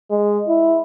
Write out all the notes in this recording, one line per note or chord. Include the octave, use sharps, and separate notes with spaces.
G#3
E4